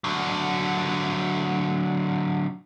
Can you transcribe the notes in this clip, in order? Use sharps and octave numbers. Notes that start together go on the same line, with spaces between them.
D3 F#3